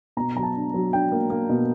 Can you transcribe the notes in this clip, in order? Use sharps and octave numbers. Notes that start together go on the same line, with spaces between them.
B2 A#5
F#3 A#5
A5
D4
F#3
D4 G5
A#3
A#3
B2